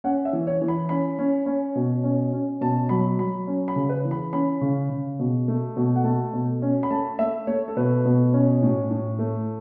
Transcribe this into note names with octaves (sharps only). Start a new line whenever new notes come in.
C#4 F#5
E5
E3
C#5
E3
B5
C#4 B5
C#4
C#4
B2
C#4
C#4
B2 A5
F#3 B5
F#3 B5
C#4
B5
C#3
B4
E3
B5
C#4 B5
C#3
C#3
B2
A3
B2
F#5
A3 A5
B2
C#4
B5
A3 A5
A3 E5
A3 C#5
A4
B2 B4
B2
C#4
A2
A2
A3